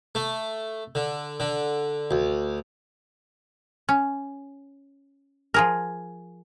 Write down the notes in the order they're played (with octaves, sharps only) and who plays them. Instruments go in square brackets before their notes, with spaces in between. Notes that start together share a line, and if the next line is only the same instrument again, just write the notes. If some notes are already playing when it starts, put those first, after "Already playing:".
[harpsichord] A3
D3
D3
D2
[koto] C#4
F3 G#4 A#4